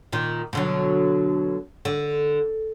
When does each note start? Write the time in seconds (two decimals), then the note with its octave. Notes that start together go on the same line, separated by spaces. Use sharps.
0.12 A#2 D#3
0.53 B2 D3 F#3
1.85 D3